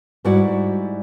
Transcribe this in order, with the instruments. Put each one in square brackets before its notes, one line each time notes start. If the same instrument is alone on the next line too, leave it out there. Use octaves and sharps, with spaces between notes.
[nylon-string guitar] G#2 G3 E4 F#4 D5 F#5